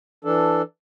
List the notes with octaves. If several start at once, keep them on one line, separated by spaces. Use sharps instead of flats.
E3 D4 A4